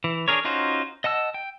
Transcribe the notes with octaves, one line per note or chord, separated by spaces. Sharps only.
E3
D4 G#4 A#4 C#5
C#4 D#4 F4 F#4 C5
D#5 F#5 A5 E6
G5